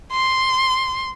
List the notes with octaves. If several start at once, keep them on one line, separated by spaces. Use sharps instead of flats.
C6